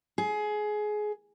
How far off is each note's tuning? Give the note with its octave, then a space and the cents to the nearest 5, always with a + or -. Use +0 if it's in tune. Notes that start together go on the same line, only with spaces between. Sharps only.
G#4 +20